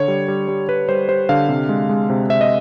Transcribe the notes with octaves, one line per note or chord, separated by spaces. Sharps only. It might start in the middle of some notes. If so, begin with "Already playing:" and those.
Already playing: D3 C#5
G3
G3
G3
G3 B4
G3 C5
G3 C5
D3 F5
C3
G#3
G#3
C3
C3 E5
D#5